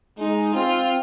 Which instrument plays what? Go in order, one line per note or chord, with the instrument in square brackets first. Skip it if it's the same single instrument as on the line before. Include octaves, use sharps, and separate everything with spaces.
[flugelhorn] G#3 [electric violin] D#4
[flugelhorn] C4 [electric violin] F4